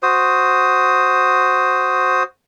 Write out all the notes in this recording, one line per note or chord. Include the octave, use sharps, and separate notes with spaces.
F#4 C5 D#6